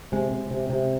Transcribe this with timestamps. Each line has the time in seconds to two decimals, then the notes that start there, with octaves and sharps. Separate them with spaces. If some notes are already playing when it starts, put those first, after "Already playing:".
0.12 C3 G#3
0.32 C3
0.51 C3
0.70 C3